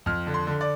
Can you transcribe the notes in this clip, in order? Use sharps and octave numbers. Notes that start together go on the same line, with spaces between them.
F2 F6
D3
C6
D3
D5